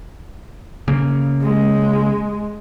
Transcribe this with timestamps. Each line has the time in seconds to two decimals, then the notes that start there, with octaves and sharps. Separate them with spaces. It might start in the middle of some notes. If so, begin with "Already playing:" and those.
0.88 C#3 A#3
1.43 G#3